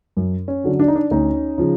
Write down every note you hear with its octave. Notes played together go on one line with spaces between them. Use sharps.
F#2
C#4
D3 F#3
D4
D#4
D4
D2 C#4 D#4
C#3 F3